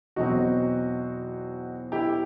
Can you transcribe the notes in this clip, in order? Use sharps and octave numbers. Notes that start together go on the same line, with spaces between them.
E2 B2 F#3 C4 D#4 F#4
E4 G4